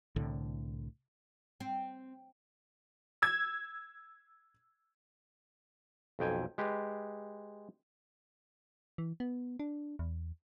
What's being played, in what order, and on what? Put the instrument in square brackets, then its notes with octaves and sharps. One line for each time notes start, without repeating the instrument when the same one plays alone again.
[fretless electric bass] C2 A2 D3
[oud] C4
[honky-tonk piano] E6 G#6
[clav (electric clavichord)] B1 F2 G5 G#5
G#3 G4 B4
[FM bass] E3
B3
D4
E2